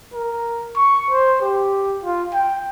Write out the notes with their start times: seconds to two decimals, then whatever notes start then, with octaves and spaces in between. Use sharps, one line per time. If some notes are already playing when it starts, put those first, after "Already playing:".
0.14 A#4
0.76 C#6
1.10 C5
1.42 G4
2.03 F4
2.34 G5